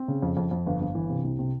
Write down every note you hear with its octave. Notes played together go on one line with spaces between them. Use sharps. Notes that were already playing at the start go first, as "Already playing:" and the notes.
Already playing: C4
C#3
F2
F2
F2
G1
G1
E3
C3
C2
C3